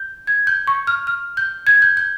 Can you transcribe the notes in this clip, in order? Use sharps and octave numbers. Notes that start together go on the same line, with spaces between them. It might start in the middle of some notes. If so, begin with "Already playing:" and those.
Already playing: G6
G#6
G6
C#6
F6
F6
G6
G#6
G6
G6